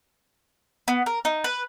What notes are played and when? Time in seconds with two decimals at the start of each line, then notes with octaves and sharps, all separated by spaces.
0.88 B3
1.06 A#4
1.25 D#4
1.44 B4